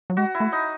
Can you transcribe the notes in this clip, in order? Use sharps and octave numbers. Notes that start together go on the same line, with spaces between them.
F#3
G#3 F#4
E4
A3
D#4